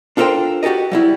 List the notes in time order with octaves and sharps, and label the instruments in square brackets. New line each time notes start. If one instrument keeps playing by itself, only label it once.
[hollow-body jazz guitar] D4 F4 A4 A#4 C5 G5
F#4 G4 A4 A#4 D#5
F#3 G3 E4